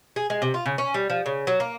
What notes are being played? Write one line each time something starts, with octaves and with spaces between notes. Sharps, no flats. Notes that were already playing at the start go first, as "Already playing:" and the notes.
G#4
G#3
C3
F4
C#3
C#4
G3
F3
C#3
F#3
A#3